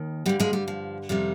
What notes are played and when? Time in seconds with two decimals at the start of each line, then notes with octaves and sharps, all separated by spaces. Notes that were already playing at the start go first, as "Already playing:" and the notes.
Already playing: D#2 D#3
0.26 G2 D3 G3
0.40 F3 G#3
0.53 G3
0.68 F3
1.09 F2 C3 D#3 G3